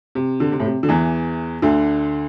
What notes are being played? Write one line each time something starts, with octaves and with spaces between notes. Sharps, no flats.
C3
D3
C3
A2
C3
D3
E2 E3
D2 D3